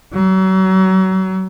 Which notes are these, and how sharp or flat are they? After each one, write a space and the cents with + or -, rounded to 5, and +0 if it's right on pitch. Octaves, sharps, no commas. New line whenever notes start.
F#3 +35